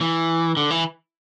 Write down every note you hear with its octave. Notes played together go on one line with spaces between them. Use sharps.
E3
D3
E3